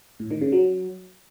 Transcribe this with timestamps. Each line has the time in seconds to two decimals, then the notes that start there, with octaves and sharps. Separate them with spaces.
0.20 A2
0.31 D#3
0.41 C#3
0.52 F#3